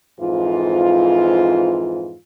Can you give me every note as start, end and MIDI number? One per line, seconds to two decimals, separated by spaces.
0.19 2.15 41
0.19 2.15 44
0.19 2.15 52
0.19 2.15 65